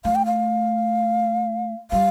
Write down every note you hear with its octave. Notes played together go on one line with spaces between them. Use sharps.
A3 F5
G5
F5
G3 F5